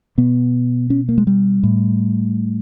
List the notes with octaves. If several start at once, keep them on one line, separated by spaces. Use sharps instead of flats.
B2 B3
C#4
A#3
G#3
G3
A2